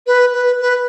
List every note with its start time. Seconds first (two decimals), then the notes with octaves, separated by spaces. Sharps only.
0.07 B4
0.33 B4
0.61 B4